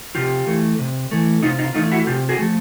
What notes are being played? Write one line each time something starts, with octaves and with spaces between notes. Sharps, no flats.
C3 F4 G4
E3 A3
C3
E3 A3
C3 D#4 F4
D#4 F4
E3 A3 D#4 F4
E4 F#4
C3 F4 G4
F#4 G#4
F3 A3